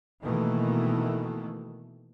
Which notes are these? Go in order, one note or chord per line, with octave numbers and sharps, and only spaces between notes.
B2 D#3 E3 A3 A#3